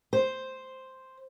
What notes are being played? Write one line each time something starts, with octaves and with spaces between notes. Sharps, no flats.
C5